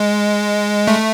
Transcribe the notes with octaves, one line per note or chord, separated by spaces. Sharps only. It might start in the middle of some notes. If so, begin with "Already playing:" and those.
Already playing: G#3
A3